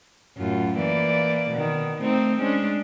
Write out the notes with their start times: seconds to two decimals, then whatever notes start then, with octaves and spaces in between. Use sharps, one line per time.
0.38 F#2 A2 F4
0.77 E3 A#3 D5
1.51 B2 D#3
2.01 A3 C4 D#4
2.41 G#3 C#4 D4